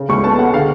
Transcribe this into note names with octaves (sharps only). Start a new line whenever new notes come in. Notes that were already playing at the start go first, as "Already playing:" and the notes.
Already playing: C#3
C#2 C#6
B3 A5
G#3 F#5
D3 F5